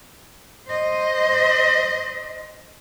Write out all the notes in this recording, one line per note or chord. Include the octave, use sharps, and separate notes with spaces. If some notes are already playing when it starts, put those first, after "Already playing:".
C5 D#5